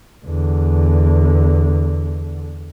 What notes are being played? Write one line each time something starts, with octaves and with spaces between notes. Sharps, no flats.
E2 D3